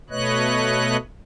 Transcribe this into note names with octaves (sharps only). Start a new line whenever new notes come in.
B2 A3 B4 C#5 D#5 F#6